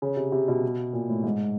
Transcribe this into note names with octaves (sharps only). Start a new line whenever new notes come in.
C#3
C3
C3
B2
A#2
A2
G#2